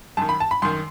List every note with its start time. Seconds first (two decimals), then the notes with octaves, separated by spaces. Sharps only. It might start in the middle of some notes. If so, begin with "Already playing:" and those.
0.17 F#2 D#3 A5
0.29 B5
0.40 A5
0.51 B5
0.62 F#2 D#3 C6